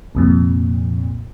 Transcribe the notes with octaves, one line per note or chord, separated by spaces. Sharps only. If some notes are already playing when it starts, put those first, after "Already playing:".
C2 F2 A#2